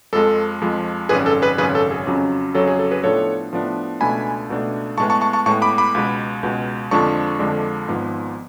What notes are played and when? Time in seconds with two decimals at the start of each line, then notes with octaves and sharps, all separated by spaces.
0.13 F2 F3 G#3 A4
0.61 F2 F3 G#3
1.09 G#1 F#2 C#3 G#4 B4
1.26 A4
1.42 G#4 B4
1.58 G#1 F#2 C#3 G#4 B4
1.75 A4
1.91 G#4
2.07 F2 C#3 F#3 C#4
2.55 F2 C#3 F#3 C#4 A4
2.67 G#4
2.79 A4
2.91 G#4 B4
3.03 A2 F3 B3 D4 A4 C#5
3.52 A2 F3 B3 D4
4.01 C#2 B2 A3 D4 G#5 B5
4.49 C#2 B2 A3 D4
4.98 A2 G#3 B3 A5 C#6
5.10 A5 C#6
5.21 A5 C#6
5.33 A5 C#6
5.46 A2 G#3 B3 A5 C#6
5.62 B5 D6
5.78 B5 D6
5.95 C#2 B2 G#3
6.43 C#2 B2 G#3
6.91 F2 D3 F3 G#3 D4 A5 C#6
7.39 F2 D3 F3 G#3 D4
7.88 G#1 G#2 F3 B3